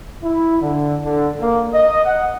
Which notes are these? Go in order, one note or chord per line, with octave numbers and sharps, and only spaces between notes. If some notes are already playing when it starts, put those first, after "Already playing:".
E4
D3
D3
A#3
D#5
F#5